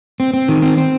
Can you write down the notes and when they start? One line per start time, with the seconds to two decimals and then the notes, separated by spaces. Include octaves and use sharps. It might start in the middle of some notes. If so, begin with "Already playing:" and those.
0.20 C4
0.34 C4
0.48 D#3
0.62 C4
0.77 C4